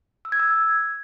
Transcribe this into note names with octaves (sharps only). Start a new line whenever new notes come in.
E6
G#6
E6